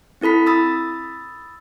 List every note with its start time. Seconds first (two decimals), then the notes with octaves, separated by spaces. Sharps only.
0.21 C4 E4 A4 B5 B6
0.46 B5 D#6 E6 A6